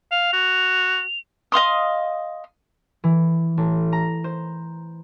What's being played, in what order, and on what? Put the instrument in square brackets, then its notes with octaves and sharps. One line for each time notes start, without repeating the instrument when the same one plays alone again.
[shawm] F5 [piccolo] F7
[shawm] F#4
[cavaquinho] D#5 F5 C6 D#6
[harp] E3
A1
A#5
C5